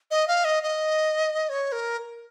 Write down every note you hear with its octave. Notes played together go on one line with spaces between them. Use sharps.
D#5
F5
D#5
D#5
C#5
A#4